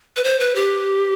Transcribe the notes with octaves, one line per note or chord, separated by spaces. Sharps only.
B4
C5
B4
G4